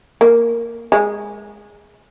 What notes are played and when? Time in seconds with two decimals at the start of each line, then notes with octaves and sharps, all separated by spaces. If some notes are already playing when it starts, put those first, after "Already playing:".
0.21 A#3
0.92 G#3